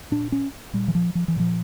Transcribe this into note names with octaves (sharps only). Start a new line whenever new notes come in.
A#2 D4
C#4
A#2 G3
E3
F3
F3
E3
A#2 F3